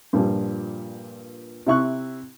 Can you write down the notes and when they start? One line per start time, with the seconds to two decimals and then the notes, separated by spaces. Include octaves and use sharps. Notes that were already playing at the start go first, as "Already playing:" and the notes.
0.13 G2 A#2 F3 G3
1.67 C3 E4 C#6 F#6